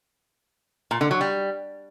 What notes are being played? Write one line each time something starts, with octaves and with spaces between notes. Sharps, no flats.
A#2
D3
F#3
G3